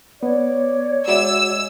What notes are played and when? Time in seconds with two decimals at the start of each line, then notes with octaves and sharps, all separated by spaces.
0.23 B3 C#5 D5
1.08 G#3 F#4 D5 E5 E6